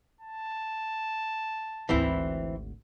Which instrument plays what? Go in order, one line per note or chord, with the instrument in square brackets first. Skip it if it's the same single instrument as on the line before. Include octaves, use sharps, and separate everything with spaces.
[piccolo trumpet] A5
[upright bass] G#1 D2 [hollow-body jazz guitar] E3 C4 E4